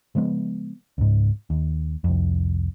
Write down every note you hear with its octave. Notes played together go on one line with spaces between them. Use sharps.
C#3 F3 G#3 B3
C#2 G#2
D#2
C2 F2